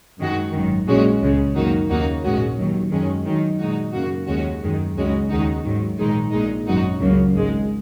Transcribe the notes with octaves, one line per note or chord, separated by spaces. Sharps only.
F#2 D#3 G#3 F#4
G#1 F#2 D#3
A#1 A#2 G#3 C#4 F#4
C#2 C#3 G#3
F#2 D#3 A#3 D#4 F#4
D#2 C#3 A#3 D#4 F#4
A#1 G#2 G#3 C#4 F#4
D#2 D#3 F#3
F#2 D#3 G#3 C#4
F#2 D#3 F#3 D#4
A#2 G#3 D#4 F#4
F#2 C#3 A#3 F#4
D#2 D#3 G#3 C#4 F#4
F#2 D#3 G#3
C#2 C#3 G#3 C#4 F#4
D#2 D#3 G#3 D#4 F#4
G#2 D#3 F#3
A#1 G#2 D#3 G#3 D#4
A#1 A#2 G#3 D#4
G#1 F#2 F#3 D#4 F#4
C#2 C#3 F#3 A#3
G#1 G#2 G#3